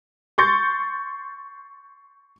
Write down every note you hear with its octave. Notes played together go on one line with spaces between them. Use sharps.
C6 C#6 G6 A6 C#7